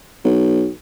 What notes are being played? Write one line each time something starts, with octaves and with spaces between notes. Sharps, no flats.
B1